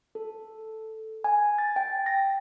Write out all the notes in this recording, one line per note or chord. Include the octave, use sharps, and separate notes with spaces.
A4
G#5
A6
G5
A#6